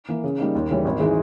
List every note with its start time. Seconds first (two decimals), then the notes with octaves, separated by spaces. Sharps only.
0.08 E3 A#3
0.24 C#3
0.39 G3 A#3 D#4
0.55 D#2
0.69 C#3 E3 G3 C#4
0.85 G#1
1.00 E3 G#3 D#4